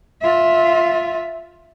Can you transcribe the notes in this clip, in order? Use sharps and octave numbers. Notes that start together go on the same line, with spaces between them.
F4 E5